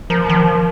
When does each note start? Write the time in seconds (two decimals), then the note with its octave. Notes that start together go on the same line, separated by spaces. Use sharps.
0.10 F3 A#4
0.29 D#3
0.37 F3